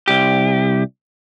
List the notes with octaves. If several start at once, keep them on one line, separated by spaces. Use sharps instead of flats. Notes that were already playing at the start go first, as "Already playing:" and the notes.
C2 G4